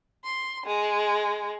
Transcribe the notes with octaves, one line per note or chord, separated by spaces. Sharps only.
C6
G#3